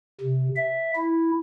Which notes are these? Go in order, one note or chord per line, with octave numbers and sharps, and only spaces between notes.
C3
E5
E4